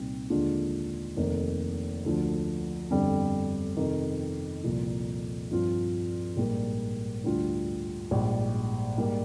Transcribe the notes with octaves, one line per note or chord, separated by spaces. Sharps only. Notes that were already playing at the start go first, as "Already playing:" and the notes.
Already playing: C2 A#2 G3 C4 D#4
D#2 D3 G#3 D4 F4
F1 F2 C3 D#3 A#3
D2 D3 F3
G1 F2 D3 G3 C4
F2 C3 D#3
C2 A#2 F3
G2 F3 C4 F4
A#1 G#2 G3 A#3
D2 D3 G3 D4 F4
A#1 G#2 G3
G#2 G3 A#3